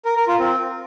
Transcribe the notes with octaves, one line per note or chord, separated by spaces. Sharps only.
A#4
A#4
F4
C4